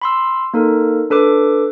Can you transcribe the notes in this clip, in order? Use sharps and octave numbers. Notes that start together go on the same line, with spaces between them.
B5 C6 E6
A#3 D#4 A4 A#4
D4 A4 B4 D6